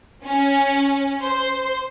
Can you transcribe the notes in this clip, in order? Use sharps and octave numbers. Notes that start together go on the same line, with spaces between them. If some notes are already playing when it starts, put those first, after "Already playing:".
C#4
C5